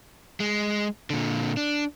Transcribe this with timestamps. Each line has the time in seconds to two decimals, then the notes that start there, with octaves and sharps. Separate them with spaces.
0.40 G#3
1.10 A#2 D3
1.57 D4